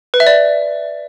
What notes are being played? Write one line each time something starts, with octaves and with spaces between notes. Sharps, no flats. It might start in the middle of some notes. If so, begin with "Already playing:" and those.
B4
E5
D5